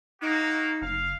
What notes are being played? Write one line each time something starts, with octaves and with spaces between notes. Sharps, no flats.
A#3 D#4 F#4
F#1 F5